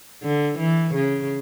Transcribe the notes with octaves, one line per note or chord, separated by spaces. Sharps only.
D3
E3
C#3